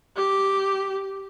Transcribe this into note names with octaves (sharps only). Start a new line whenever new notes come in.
G4